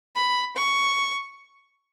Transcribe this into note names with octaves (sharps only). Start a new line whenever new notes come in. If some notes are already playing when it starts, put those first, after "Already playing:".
B5
C#6